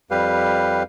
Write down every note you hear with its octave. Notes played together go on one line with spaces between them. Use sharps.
F2 G3 G4 B4 F5